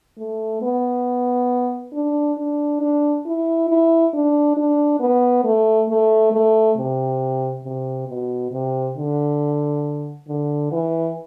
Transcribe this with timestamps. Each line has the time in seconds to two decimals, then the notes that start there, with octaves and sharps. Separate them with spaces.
0.18 A3
0.62 B3
1.93 D4
2.38 D4
2.81 D4
3.26 E4
3.68 E4
4.13 D4
4.57 D4
5.00 B3
5.44 A3
5.89 A3
6.32 A3
6.77 C3
7.64 C3
8.08 B2
8.51 C3
8.97 D3
10.28 D3
10.72 E3